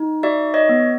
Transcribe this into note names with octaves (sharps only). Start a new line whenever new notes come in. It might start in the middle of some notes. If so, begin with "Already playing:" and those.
Already playing: D#4
F#4 D5 E5
C#5 D#5
B3